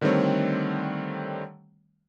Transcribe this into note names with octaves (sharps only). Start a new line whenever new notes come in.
D3 D#3 G3 A3 C4 C#5